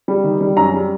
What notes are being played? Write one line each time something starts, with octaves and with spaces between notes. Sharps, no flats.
G3
D#3
G3
F#2 A#5
G3